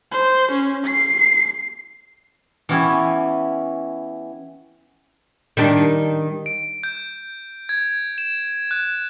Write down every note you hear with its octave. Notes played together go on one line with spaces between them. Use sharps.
C5
C#4
C7
E3 B3 C#4 E4 G4
D#3 G3 D4
D7
G6
G#6
E7
F#6